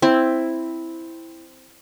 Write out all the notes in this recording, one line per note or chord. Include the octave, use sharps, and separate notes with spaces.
C4 E4